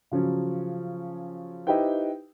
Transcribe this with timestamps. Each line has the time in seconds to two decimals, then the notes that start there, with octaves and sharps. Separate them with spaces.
0.11 C#3 F3 F#3 C#4
1.67 D#4 E4 G4 B4 C5 G5